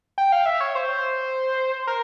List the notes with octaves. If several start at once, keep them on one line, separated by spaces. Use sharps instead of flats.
G5
F5
E5
C#5
C5
A#4